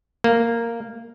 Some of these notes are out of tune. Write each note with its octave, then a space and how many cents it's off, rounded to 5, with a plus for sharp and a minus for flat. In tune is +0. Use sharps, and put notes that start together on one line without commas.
A#3 -10